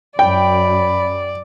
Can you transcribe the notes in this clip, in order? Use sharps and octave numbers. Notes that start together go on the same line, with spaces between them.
F#2 D5 G5 B5